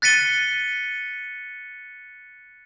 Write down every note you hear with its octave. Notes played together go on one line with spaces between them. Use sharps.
F#6 A6 B6 C#7 D#7 G7